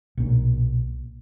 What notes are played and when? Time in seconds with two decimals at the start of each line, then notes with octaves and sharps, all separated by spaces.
0.17 B1 A#2